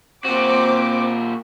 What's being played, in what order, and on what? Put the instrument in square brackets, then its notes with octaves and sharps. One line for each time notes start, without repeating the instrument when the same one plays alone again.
[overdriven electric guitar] A#2 F#4 [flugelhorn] C4 [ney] C5 [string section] D6